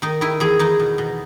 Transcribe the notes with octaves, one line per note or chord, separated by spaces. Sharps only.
D#3 D#4
D#3 E4
E2 G#4
E2 D#4
B2
B2